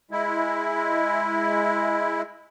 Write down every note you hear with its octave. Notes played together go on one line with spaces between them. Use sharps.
G#3 E4